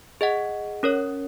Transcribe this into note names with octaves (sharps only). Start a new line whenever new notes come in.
G#4 D#5 F#5
C#4 A#4 C#5